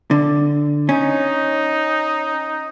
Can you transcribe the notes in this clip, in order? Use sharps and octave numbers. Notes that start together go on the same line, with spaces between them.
D3
C#4 D#4